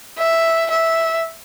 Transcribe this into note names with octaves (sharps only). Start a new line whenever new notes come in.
E5
E5